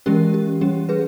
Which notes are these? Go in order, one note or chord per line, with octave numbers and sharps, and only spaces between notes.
E3 G#3 C#4 G4 A#4
G4
G3 C#4 G4
G#4 B4